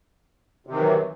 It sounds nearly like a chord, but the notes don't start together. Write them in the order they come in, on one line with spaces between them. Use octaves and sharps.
C3 D#3 E3 F#3